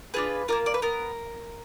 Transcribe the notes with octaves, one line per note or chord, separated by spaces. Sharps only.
D4 F4 G#4 B4
A#3 D4 F4 A#4
D5
B4
B3 A#4